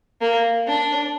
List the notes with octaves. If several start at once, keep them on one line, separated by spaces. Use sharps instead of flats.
A#3
D4